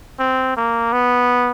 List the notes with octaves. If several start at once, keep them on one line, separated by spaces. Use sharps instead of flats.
C4
A#3
B3